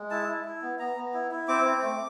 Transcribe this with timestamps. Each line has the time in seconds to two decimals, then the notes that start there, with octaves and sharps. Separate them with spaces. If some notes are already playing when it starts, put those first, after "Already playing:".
Already playing: G#3
0.11 E4 A5
0.28 E4
0.44 E4
0.62 B3
0.79 B3 A#5
0.96 B3
1.14 E4
1.31 E4
1.48 C4 D6
1.65 C4
1.82 A3